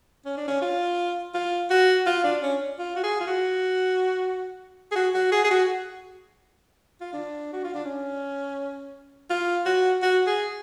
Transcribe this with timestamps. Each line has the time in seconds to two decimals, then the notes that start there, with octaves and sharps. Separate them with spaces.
0.26 C#4
0.37 D4
0.48 C#4
0.62 F4
1.34 F4
1.70 F#4
2.06 F4
2.24 D4
2.42 C#4
2.79 F4
2.96 F#4
3.03 G#4
3.20 F4
3.27 F#4
4.91 G#4
4.95 F#4
5.14 F#4
5.32 G#4
5.44 G#4
5.50 F#4
7.01 F4
7.13 D4
7.53 F#4
7.64 F4
7.74 D4
7.85 C#4
9.30 F4
9.66 F#4
10.02 F#4
10.27 G#4